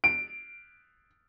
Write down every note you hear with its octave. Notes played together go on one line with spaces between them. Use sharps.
D7